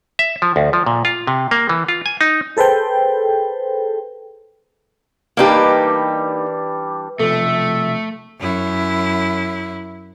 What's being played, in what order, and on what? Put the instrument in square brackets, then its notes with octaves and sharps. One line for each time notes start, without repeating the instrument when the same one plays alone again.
[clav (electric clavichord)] E5
F3
D2
F3
A#2
F4
C3
A#3
E3
F4
G#5
D#4
[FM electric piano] G#4 A4 B4 C5 G5
[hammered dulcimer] E3 G3 D4 [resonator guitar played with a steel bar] A#3 D#4 G4
[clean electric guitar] B1 C3 F3 [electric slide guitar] A3 [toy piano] A4 [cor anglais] E5
[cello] F#2 E4